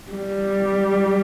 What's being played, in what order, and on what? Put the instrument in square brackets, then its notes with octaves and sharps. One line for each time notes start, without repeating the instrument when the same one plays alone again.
[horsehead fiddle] G3